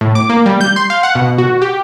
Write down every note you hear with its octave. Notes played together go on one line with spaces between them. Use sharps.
A2
D6
A#3
G3
G6
C6
F5
F#5
B2
F#4
G4